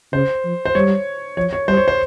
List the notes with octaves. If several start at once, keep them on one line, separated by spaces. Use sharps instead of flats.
C#3 C5
F3
C5
G3 C#5
F3 C#5
C#5
G3 C5
C#5
C5